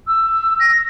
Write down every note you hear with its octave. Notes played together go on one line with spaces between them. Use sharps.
E6
A#6